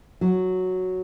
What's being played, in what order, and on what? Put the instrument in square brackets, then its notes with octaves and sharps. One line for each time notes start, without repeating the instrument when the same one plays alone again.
[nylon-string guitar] F#3